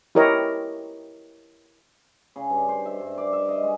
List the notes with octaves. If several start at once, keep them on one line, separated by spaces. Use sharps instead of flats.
E4 G4 A#4 C#5 D#5
C#3
G2
C5
E5
G2
D5
E5
D#5
G#3